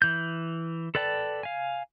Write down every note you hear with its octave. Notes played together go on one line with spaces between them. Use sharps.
E3 G6
A4 B4 D5 G5 A5
F5 G#5